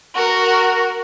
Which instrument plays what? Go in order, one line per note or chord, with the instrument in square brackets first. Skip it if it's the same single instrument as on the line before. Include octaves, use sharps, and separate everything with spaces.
[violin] F#4 A#4